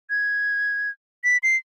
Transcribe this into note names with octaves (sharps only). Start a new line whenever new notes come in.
G#6
B6
C7